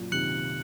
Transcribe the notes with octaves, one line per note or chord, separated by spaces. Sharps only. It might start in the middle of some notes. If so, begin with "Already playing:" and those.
Already playing: F#2 A#2
C3 D#3 F#6 C#7 F#7